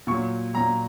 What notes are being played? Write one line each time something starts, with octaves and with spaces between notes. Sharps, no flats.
A#2 F#3 C#6
A#2 F#3 A#5